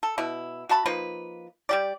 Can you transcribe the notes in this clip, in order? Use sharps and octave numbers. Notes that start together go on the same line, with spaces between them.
A4
B2 E4
F#4 E5 A5 B5
F3 A#3 D#4 B4
G3 G4 D5